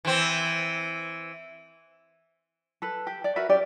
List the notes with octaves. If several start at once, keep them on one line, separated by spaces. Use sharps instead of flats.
E3 C4
A4 B4
G4
D5
F#4 A#4 B4 E5
C#4 G4 D5